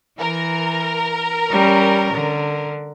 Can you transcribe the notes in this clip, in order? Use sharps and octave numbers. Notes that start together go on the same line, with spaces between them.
E3 A#4
G3 C#4
D3